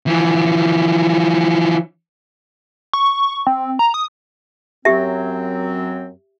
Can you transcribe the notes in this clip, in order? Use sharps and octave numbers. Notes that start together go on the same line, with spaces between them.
E3 F3
C#6
C4
A#5
D#6
F#2 F#3 C4 G4 E5